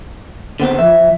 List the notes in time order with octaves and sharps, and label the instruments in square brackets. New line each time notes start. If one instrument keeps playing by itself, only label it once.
[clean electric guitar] D3 B3 C4
[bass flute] F3 [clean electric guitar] E5